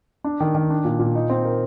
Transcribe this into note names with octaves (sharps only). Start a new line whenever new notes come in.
D4
D#3
D#3
D4
A#2
A#2
D#4
C4
A#4